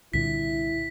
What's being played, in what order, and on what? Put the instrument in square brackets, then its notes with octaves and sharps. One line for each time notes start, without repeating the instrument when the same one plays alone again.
[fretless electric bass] C2 A#2 D3 [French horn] E4 [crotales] B6